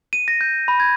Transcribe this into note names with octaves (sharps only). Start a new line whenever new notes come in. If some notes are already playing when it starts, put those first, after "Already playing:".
D#7
A#6
G6
B5
G#6